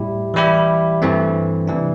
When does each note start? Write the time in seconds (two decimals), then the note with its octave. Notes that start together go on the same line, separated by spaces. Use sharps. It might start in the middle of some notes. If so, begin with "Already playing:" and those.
Already playing: A2 G3 E4 G4
0.34 E3 G3 E4 G4
1.02 G2 E3 A3 C4
1.67 C3 E3 G3 D4